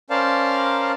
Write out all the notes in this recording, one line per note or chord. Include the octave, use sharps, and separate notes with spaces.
C#4 A#4 C5 D5 F5 A5